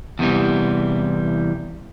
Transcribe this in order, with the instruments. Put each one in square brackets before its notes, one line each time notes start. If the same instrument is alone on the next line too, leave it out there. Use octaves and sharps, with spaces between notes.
[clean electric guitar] E2 C3 E3 G3